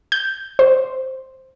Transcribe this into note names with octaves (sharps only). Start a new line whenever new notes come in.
G6
C5